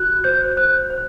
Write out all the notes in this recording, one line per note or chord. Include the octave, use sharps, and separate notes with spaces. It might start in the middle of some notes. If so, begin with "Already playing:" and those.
Already playing: F#4 F#6
C5 G6
C5 F#6
C5